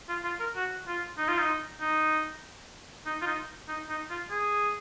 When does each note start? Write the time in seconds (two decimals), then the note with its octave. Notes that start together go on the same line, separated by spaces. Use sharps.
0.09 F4
0.24 F4
0.40 A#4
0.56 F#4
0.87 F4
1.18 D#4
1.28 F4
1.39 D#4
1.81 D#4
3.06 D#4
3.22 F4
3.27 D#4
3.68 D#4
3.90 D#4
4.10 F4
4.31 G#4